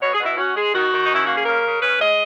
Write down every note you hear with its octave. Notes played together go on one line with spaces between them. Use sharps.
B2 C#5
G#4
B2 E4
C#4 F#4
G#3 G#4
D#3 F#4
D#3
C#4 D#4
E4
A#3 F#4
G#4
C#3 A#4
C#3
C#4 B4
G#3 D#5